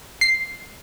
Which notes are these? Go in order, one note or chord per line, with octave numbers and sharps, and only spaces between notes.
C7